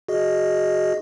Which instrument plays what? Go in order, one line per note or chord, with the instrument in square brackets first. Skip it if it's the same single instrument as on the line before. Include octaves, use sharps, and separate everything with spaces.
[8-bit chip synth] F#4 G#4 D#5